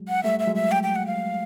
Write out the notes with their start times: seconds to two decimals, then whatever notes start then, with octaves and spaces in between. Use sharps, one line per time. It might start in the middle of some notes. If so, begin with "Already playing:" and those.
Already playing: F#3 G#3
0.08 F#5
0.23 G3 A3 E5
0.39 E5
0.47 F#3 G#3
0.55 E5
0.72 G5
0.83 G5
0.96 F#5
1.06 F5